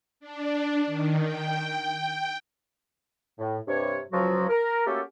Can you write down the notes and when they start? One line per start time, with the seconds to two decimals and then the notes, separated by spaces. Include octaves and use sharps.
0.20 D4
0.86 D#3
1.22 G5
3.39 A2
3.68 G2 C3 C#5
4.12 C#2 F3 F#3 F#4
4.49 A#4
4.86 A3 A#3 C#4 F#4 G4 A4